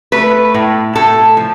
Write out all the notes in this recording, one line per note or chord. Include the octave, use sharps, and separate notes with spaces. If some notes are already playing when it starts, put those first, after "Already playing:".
A3 B4
A2
A2 A4
F3